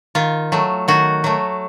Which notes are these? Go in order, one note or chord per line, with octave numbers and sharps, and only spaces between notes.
D#3 F4
F#3 A3
D#3 F#4
F#3 A3